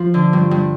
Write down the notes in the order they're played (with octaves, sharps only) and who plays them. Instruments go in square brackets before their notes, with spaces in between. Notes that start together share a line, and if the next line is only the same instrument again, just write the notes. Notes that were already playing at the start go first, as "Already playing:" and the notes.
Already playing: [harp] F3
D3
G2
G2